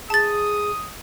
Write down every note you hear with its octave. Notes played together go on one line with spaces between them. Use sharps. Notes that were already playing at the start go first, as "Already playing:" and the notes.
G#4 A5 D#6 A6